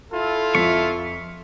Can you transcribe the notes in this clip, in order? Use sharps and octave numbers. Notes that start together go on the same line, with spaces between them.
E4 F4 A4
F2 E5 C#6